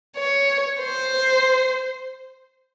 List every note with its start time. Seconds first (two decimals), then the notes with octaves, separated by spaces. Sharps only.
0.17 C#5
0.80 C5